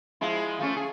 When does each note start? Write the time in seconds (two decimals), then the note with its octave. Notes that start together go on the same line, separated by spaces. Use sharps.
0.21 F3 G#3 E4
0.59 F3 A3 C#4
0.77 G#4